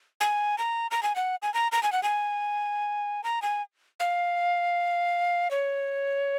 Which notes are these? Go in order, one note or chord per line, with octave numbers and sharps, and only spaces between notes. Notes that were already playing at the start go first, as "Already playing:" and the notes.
G#5
A#5
A#5
G#5
F#5
G#5
A#5
A#5
G#5
F#5
G#5
A#5
G#5
F5
C#5